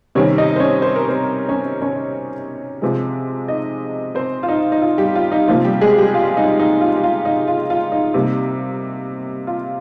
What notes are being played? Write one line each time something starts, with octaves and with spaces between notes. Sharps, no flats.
C3 D#3 G3 C4 C#4 C#5
D#4 D#5
C5
C#4 C#5
C5
A#4
C4 C5
C#4 C#5
C#4 C#5
C3 F3 G#3
D#4 D#5
C4 C5
F4
D#4
D#4
F4
G3 G4
F4
D#4
C3 F3 A#3 F4
G3 G4
G#3 G#4
G3 G4
F4
D#4
D#4
F4
G4
F4
D#4
F4
F4
D#4
C3 G3 A#3
F4